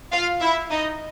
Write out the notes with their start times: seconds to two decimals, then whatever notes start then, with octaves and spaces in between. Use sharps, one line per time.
0.12 F4 F5
0.41 E4 E5
0.70 D#4 D#5